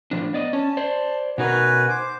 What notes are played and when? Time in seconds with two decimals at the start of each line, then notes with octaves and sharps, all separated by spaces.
0.11 A2 F3 D4
0.33 B3 D5 D#5
0.53 C#4 A5
0.77 C5 D5
1.38 B2 D#4 F#4 A#4 B4 G#5
1.89 C5 D6